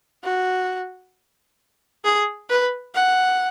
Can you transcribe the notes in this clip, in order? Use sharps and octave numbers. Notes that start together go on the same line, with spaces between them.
F#4
G#4
B4
F#5